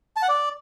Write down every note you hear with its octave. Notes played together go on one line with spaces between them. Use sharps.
A5
F#5
D5